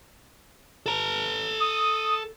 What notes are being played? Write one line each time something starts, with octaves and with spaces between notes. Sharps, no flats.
A4 A#5
D#6